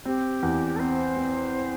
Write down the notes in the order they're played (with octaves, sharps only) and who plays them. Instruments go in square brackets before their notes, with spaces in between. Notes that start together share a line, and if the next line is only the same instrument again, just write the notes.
[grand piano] C4 [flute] G4
[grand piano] E2
[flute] A4
[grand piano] C4 [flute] C5
[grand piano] C4